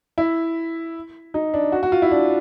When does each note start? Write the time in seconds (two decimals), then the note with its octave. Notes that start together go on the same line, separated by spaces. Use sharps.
0.18 E4
1.34 D#4
1.54 D4
1.72 F#4
1.83 F#4
1.92 F4
2.02 E4
2.11 D4